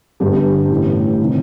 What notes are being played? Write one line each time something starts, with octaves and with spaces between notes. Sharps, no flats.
G1 G2 D3 G3 G4
A1 A2
C3 D#3